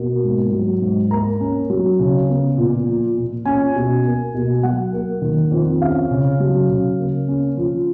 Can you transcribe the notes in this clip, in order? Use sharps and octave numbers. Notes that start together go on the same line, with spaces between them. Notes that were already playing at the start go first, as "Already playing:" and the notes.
Already playing: B2 A#3
G#2
F#3
G#2
A#3 A#5
C#4
F#3
C#3
B3
A#2
F3
A#2
C#4 G#5
B2
A#3
B2
F#3 F#5
A#3
D#3
F2
C#4 F5
C#3
F#3
C#3
A#3
C#4
F3